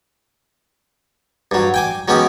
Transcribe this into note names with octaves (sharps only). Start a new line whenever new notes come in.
G2 F#3
G5 G#5 D6
F#3 G#3 B3 C#4 G4